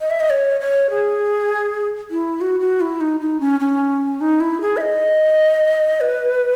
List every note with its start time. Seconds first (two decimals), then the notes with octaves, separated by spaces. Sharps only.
0.01 D#5
0.10 E5
0.20 D#5
0.30 C#5
0.60 C#5
0.90 G#4
2.11 E4
2.41 F#4
2.60 F#4
2.81 E4
3.01 D#4
3.20 D#4
3.40 C#4
3.60 C#4
4.21 D#4
4.40 E4
4.61 G#4
4.77 E5
4.81 D#5
6.01 B4